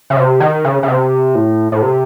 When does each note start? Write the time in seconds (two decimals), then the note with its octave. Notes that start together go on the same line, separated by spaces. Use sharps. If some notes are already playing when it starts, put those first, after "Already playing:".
0.10 C#3
0.17 C3
0.40 D#3
0.65 C#3
0.83 C#3
0.88 C3
1.35 A2
1.72 A2
1.82 C3